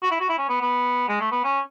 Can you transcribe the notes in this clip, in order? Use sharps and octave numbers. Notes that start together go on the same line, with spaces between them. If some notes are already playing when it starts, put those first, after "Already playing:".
F#4
E4
F#4
E4
C#4
B3
B3
G#3
A3
B3
C#4